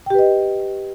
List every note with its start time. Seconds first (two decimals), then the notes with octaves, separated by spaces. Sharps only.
0.06 G5
0.10 G4
0.15 B4
0.19 D#5